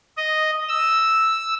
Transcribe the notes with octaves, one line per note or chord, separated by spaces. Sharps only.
D#5
E6